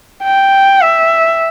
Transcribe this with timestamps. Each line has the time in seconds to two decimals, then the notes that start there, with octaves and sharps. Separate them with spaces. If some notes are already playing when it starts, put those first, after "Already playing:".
0.23 G5
0.81 E5